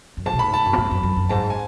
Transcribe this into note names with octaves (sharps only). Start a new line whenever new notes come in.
F#2
G#2 A5
B2
A2 B5
G#2 A5
F#2
B2
A2
G#2
F#2
F#2
F#2
G#2 A5
G#5